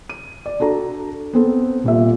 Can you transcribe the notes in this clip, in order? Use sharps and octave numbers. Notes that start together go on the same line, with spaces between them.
D#7
D5
D4 F#4 A4 A#5
B3 C4 A4
D#1 A#2 E5